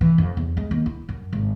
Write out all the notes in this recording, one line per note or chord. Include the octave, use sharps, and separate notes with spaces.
E3
F2
E2
G#3
D#2
E4
F#2
G#1